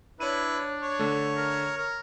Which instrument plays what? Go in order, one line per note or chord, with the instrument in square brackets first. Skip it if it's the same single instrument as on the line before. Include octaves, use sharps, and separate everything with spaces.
[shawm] D4 [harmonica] E4 B4 [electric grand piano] C#5 D#7
[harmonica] C#5
[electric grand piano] D3 A3
[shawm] A#4
A#4